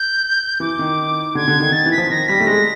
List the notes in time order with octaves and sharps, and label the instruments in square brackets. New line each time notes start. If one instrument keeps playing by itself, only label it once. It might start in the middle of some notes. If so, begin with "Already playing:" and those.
Already playing: [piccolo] G6
[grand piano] E3 [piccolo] D6
[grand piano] D#3
[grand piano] D3 [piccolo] G#6
[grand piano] D3
D#3
[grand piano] D#3 [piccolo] A6
[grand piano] E3
[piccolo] B6
[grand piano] F3
[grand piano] D#3 [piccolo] A#6
[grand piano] G3 [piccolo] B6
[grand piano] A3
[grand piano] G#3 [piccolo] A#6